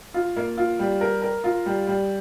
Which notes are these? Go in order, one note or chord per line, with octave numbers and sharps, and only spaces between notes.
F4
A#3
F4
G3
A#4
A#4
F4
G3
G3